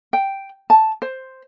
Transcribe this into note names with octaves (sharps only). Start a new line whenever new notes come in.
G5
A5
C5